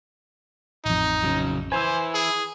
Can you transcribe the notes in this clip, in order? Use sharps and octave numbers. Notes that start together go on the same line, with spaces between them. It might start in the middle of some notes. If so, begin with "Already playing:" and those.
A1 F2 D#4
C#3 F#3
E4 B4 C5 G#5 E6
G#4